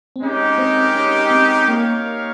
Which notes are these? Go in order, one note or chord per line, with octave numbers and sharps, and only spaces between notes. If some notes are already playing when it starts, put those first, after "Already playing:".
C4
G#3 C#4 D#4 G4 A#4
C4
C#4
C4
A#3 D#4 G4 A#4 C#5 F5